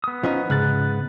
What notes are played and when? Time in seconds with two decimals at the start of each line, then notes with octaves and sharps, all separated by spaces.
0.04 B3 D#6
0.23 F3 C#4 D#4
0.50 G#2 C#3 F#6 A6